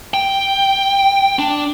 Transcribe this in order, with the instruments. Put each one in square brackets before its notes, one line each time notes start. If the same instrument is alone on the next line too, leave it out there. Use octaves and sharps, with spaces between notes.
[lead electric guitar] G5
D4